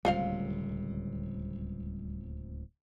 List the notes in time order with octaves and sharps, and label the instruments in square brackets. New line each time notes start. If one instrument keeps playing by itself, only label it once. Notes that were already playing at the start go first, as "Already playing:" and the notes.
[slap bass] D1 C#2 C3 [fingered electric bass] G3 [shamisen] F4 C5 F5